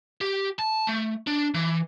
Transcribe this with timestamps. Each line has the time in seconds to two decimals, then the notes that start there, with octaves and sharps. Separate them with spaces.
0.21 G4
0.59 A5
0.87 A3
1.27 D4
1.54 E3